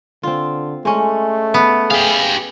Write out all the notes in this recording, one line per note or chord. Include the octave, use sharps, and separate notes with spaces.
D3 C4 F4
G#3 A3 C#4
B3
G4 G#4 F5